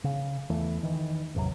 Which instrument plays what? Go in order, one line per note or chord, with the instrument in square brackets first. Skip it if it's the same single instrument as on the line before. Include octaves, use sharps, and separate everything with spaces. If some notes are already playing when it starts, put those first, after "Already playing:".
[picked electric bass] C#3
E2 E3 A3
D#3 E3
A1 E2 C3 F#3